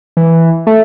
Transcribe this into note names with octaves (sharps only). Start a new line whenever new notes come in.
E3
A3